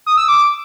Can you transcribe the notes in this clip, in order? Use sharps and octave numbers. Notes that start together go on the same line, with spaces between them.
D#6
E6
D6